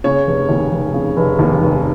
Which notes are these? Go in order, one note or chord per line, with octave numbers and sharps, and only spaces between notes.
C#3 C#5
F1
D#2
F1
C#3
F1
D#2
F1